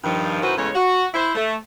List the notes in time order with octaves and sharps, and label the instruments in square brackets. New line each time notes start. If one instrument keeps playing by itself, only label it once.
[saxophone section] G2 D#3 F3
F#2 D#3 E4 F#4 B4 C5
E2 C#3 G#3 A3 C#5
F#4
E4 C5
A3